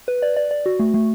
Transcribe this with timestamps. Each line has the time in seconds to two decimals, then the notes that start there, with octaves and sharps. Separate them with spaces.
0.08 B4
0.22 D5
0.37 D5
0.51 D5
0.66 F#4
0.79 A3
0.94 A3